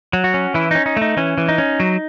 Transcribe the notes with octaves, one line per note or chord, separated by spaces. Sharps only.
F#3
F#4
C#4
E3 E4
C#4 D#4
D#4
A3 D#4
E3 C#4
E3
D#4
C#4
F#3